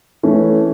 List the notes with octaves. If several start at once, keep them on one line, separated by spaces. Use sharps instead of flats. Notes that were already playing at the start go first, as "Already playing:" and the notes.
E3 A3 C#4